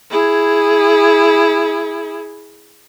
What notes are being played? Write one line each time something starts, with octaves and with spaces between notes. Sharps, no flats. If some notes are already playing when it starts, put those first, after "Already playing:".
E4 G#4